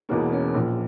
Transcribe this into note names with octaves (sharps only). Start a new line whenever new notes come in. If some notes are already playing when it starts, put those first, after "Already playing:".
E1 E2 B2 A#3
C#4
A#1 A#2